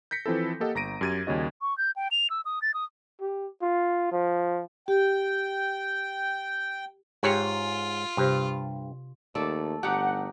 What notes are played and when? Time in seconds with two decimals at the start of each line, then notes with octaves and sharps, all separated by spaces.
0.11 G6 A#6 B6 C#7
0.26 E3 F3 C4 E4 A4
0.60 A#3 G4 A4 D#5 F#5
0.75 G1 A#5 A#6 D7 D#7
1.01 F#2 G4 G#6 A6 D#7
1.27 D#2 C#3 G3 C#4 F#4 D#5
1.62 C#6
1.78 G6
1.96 G5
2.11 F7
2.30 E6
2.45 D#6
2.62 A6
2.74 D#6
3.20 G4
3.62 F4
4.12 F3
4.88 G4 G5
7.23 G#2 F4 G4 C#5 G5
8.17 G2 C3 G4 C5
9.35 D#2 A3 A4 D5
9.83 G1 D#4 G4 F#5